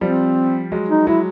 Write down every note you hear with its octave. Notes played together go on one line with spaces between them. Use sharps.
F3 G3 C4
F#3 G#3
D#4
F#3 G#3 E4